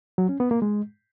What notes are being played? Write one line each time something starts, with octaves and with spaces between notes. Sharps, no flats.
F#3
C#4
B3
A#3
G#3